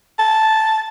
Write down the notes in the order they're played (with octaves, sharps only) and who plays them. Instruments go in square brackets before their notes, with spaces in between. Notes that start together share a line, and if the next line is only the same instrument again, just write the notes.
[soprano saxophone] A5